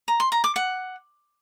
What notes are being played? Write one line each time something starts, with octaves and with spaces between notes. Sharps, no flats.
A#5
C6
A#5
D6
F#5